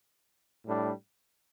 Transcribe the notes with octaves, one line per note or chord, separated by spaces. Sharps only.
A2 G3 D4